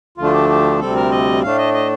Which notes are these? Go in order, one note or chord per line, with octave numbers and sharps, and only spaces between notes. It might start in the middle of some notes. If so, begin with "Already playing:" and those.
D2 D3 F3 A3 D4 F4
G4
G4
D2 C3 G3 C4 A4
A#4
D#5
A2 A3 D4 F5
D#5
D#5